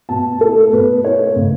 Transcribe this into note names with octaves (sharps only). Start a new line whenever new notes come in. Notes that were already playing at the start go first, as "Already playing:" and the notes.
B2 A5
A3 E4 A4
B2 B4
A3 E4 C#5
C#3